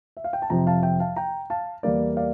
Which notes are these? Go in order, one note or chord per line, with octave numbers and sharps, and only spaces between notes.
E5
F5
G5
A5
F2 C3 F3 G5 A#5
F5 A5
E5 G5
F5 A5
G5 A#5
F5 A5
E2 E3 G3 A#3 D5 F5
D5 F5